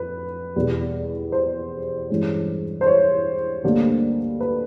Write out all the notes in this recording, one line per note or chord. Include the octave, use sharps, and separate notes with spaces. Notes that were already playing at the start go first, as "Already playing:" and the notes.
Already playing: F2 B4
E2 B2 G3
C5
G2 E3 G#3 C#4
C5
C#5
D2 D3 G3 A#3 D4
B4